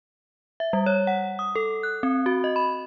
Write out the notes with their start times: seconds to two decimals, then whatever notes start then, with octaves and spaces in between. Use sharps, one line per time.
0.60 E5
0.73 G3
0.86 C#5
1.07 F#5
1.39 D#6
1.56 A4
1.83 F#6
2.03 C4
2.26 F#4
2.44 D#5
2.56 B5